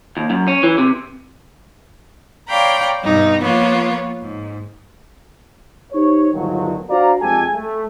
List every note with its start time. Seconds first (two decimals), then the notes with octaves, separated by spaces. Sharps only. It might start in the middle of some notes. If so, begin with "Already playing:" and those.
0.17 D#2
0.30 F#2
0.48 C#4
0.63 E3
0.78 C3
2.49 C#5 D5 F5 G5 A#5 B5
3.03 G2 B2 D#4
3.42 F3 A#3 B3 F4 C#5
4.21 G#2
5.92 D#4 G4 C5 C#5
6.33 G1 D2 G2 D#3 F3 F#3
6.90 D4 F#4 C5 D5 F5 A#5
7.21 F2 G#3 A3 G4 A4 G#5
7.55 A3